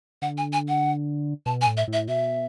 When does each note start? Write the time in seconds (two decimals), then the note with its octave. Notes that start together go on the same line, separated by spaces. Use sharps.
0.22 D3 F#5
0.38 G#5
0.53 G#5
0.68 F#5
1.46 B2 A5
1.61 G#5
1.67 A2
1.77 E5
1.88 A2
1.93 E5
2.08 B2 E5